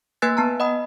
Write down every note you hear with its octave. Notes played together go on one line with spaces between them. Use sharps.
A#3 B4 G#5 E6 F#6 A6
B3 A5 A#5
D#5 F#5 B5 D#6